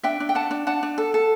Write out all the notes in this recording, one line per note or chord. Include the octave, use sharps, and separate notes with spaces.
D4 E5 G5
D4
G5
D4 F#5 A5
D4
D4 F#5 A5
D4
A4
A4